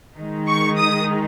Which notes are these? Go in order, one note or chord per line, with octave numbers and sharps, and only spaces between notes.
D#3 G#3 D#4
C#6
D#6